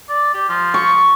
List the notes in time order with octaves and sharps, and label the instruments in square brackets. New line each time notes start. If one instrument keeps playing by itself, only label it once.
[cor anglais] D5
G4
F3
[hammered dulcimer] C#6